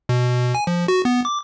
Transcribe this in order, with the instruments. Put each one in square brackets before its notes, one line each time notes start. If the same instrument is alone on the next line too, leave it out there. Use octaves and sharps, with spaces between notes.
[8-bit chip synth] B2
G#5
F3
F#4
B3
D6